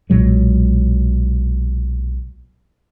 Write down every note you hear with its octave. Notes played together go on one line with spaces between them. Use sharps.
B1 A#2 F#3 G#3